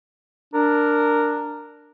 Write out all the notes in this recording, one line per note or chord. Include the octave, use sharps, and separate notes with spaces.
D4 A#4